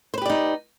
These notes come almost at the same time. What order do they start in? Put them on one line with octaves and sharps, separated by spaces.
C5 B4 G4 D5 D#4